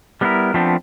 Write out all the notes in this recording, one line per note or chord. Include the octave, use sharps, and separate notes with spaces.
G3 B3 C#4 D4 E4 A#4
F3 A3 B3 C4 D4